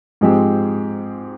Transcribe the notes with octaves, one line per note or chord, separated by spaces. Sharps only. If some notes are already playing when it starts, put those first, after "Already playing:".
G#2 F3 G#3 C4 G4